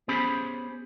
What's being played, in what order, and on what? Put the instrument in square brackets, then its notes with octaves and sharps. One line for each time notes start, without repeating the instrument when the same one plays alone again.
[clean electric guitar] B3 C#4 G4 G#4 C5 B5